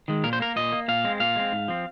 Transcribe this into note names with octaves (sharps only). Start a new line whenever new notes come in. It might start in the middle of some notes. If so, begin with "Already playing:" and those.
D#3 G#3
A#2 A#4
C5
A#3 A#4
A#2 D#5
A#3
A#2 F5
G#3 C4
A#2 F5
G#3 C4
G#2
F3 C4